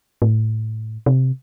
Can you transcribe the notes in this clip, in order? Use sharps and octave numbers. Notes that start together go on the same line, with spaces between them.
A2
C3